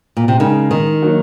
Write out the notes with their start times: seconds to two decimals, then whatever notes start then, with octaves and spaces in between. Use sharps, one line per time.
0.17 A#2
0.28 C3
0.39 C#3 G#3 D#4 A#4
0.71 D#3
1.02 F#3 A#3 D#4 F#4